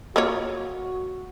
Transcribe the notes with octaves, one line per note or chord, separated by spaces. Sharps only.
A#3 F4 F#4 C#5